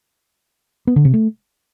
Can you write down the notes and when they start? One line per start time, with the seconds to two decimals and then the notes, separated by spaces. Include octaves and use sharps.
0.87 B3
0.96 D3
1.05 C3
1.14 A3